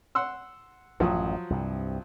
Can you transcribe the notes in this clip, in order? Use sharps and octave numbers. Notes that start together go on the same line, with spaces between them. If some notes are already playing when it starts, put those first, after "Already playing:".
F#5 C6 E6
A1 F#2 A2 F3 F#3 D#6
C2 G2 C3